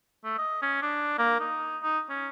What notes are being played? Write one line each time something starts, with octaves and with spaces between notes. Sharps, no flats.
A3
D#5
C#4
D4
A#3
D#4
D#4
C#4